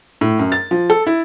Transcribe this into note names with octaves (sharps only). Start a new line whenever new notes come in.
A2
F#2
A6
F3
A4
E4